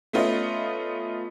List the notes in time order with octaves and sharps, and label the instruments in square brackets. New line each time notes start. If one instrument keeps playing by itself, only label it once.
[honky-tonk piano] A3 B3 C#4 F4 B4 D#5